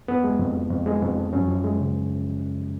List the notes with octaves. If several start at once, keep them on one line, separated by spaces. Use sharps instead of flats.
F2 B3
G#3
F2
F3
F2
G#3
F2
F3
F#2 C#4
F3
G#3
C#3